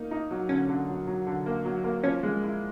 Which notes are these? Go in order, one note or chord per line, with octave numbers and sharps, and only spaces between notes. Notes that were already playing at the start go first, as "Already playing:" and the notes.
Already playing: A#3 D#4
D#4
F#3
D3 C#4
D3
F#3
F#3
D3
A#3
F#3
A#3
F3 C#4
G#3
E4